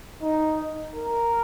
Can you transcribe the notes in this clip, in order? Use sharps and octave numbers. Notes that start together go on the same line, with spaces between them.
D#4
A#4